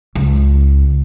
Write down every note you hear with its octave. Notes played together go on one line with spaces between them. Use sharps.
C#2